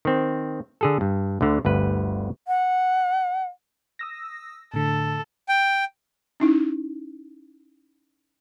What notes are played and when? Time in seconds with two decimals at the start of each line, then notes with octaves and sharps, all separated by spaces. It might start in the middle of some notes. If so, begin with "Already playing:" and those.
0.05 D#3 C4
0.81 D3 G#4 A4
1.01 G2
1.41 D2 D3
1.65 G1 D2 B4
2.48 F#5
3.99 D#6 E6 A#6
4.74 A2 D3 A4
5.48 G5
6.40 C#4 D#4 E4